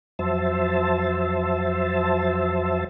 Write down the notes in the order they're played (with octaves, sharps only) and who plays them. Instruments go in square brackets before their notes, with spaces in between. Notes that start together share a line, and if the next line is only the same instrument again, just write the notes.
[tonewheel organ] F2 F#3 C5 E5 A5